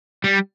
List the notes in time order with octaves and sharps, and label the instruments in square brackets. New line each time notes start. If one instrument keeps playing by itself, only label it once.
[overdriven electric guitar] G3